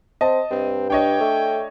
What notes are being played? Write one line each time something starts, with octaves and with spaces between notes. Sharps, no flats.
C4 D#5 A5
G2 C4
D4 C#5 D#5 G5
A3